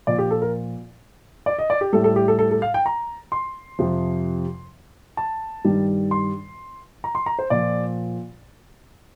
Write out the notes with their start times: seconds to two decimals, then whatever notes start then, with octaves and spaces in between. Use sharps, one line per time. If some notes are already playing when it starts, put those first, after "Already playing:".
0.07 A#2 F3 D5
0.18 G4
0.31 A4
0.42 A#4
1.46 D5
1.58 D#5
1.70 D5
1.81 G4
1.93 A2 G3 A4
2.04 A4
2.16 G4
2.28 A4
2.39 A4
2.52 A4
2.62 F5
2.74 G5
2.86 A#5
3.32 C6
3.79 F2 C3 F3
5.17 A5
5.65 G2 D#3 G3
6.11 C6
7.04 A#5
7.15 C6
7.26 A#5
7.39 C5
7.50 A#2 F3 D5